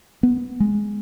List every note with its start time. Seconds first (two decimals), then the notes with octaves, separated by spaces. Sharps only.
0.23 B3
0.60 G#3